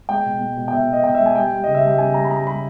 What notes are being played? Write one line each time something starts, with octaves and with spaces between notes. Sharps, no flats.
G#3 G5
B2
G#3
B2
G5
B2 E5
B2 D#5
B2 G5
G#3 E5
G#5
G3 G5
G3
C#3 D#5
E5
G3
G5
C#3 G#5
G3 A#5
B5
G3 A#5
G3 B5